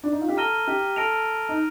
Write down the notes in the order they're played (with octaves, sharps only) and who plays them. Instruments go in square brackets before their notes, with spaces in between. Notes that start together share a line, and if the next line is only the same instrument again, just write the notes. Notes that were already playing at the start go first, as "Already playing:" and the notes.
[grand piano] D4
D#4
F4
G4
[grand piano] A4 [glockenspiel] A#5 F6 A#6 D#7 G7
[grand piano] G4
[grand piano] A4 [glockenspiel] F6 A#6 D7 F7
[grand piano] D#4